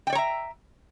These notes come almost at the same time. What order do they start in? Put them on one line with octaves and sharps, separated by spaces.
G5 D5 C#5 A#5 E5